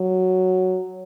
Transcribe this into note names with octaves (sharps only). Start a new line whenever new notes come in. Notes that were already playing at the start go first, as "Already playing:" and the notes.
Already playing: F#3